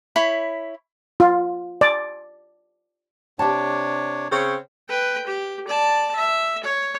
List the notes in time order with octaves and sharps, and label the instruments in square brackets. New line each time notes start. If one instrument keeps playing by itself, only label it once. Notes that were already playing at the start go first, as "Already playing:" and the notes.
[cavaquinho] E4 C#5 B5
[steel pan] F4
D5
[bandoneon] C3 D4 C#5 [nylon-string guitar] G4 A5
[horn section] C#3 C4 C#5
[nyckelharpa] B4 G5
G4
D5 A5
E5
C#5